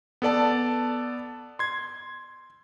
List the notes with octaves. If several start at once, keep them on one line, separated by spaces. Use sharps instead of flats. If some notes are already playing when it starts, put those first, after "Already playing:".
B3 A4 D5 A5
C6 G#6